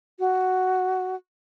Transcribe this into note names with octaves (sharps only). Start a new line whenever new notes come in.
F#4